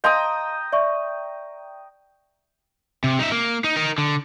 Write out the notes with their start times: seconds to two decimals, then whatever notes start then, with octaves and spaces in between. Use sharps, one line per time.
0.04 D#5 F5 G5 A#5 C6 D#6
0.72 D5 E5 C#6
3.04 C3
3.19 D#4 E5
3.32 A#3
3.64 D#4
3.77 D#4 A#4
3.98 D3